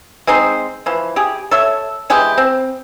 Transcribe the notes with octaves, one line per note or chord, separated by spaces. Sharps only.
G#3 C4 D#4 C5
E3 F3
G4 G#4
A4 C#5 E5
E3 G#3 G4 G5
C4